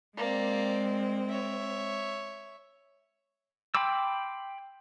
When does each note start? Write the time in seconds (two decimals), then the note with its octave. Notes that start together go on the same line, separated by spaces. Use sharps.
0.17 G#3 A#3 C4 D5
1.29 C#5 E5
3.75 G5 B5 C6 D6 E6